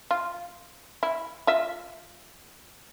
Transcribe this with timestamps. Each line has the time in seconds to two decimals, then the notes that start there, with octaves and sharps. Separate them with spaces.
0.11 F4
1.03 E4
1.47 F4 E5